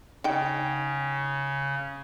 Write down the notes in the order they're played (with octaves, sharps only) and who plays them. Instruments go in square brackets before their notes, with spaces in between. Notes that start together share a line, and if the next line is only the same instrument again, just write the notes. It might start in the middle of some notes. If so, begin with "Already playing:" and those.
[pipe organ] C#3 [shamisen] D#4 G5